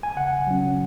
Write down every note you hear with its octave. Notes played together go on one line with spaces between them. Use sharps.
G#5
C#3 F#5
F#3 C#4